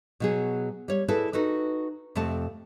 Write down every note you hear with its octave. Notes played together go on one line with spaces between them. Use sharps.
B2 F#3 G#4
G3 C#5
E4 G#4 A4 B4 D5
D#4 F#4 A4 B4
F2 C3 A3 A5